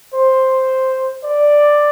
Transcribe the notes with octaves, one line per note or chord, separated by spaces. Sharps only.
C5
D5